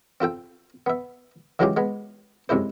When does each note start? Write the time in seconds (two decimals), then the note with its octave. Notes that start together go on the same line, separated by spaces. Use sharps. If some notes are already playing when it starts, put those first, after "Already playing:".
0.21 C4 F4 A4 G5
0.86 B3 E5
1.59 E3 F#3 G#3 C#4 F4 G4
1.77 G#3 B3
2.49 F#2 C3 G#3 E4 C5